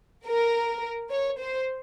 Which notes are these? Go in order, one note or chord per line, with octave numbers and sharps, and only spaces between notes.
A#4
C#5
C5